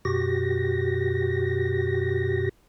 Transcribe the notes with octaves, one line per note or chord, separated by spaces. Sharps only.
F#2 B2 F#4 G4 A#6